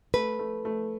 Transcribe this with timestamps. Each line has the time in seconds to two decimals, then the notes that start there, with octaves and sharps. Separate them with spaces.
0.14 A3 B4
0.39 A3
0.65 A3